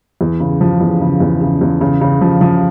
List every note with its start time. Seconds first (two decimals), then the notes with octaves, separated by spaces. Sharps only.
0.21 E2
0.40 C#3
0.61 F3
0.81 E2
1.01 C#3
1.20 E2
1.41 C#3
1.61 E2
1.81 C#3
2.01 C#3
2.21 F3
2.41 F3